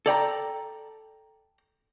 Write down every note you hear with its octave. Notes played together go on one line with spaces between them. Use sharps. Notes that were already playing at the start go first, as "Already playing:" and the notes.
A4 D5 G5 A#5